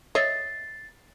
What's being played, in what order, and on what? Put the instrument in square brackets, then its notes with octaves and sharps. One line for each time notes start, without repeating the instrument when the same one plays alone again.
[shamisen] C#5 D#5 E5 [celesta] A6 C7